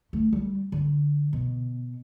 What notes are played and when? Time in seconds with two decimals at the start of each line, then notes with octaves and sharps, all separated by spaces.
0.13 A3
0.33 G3
0.72 D3
1.33 B2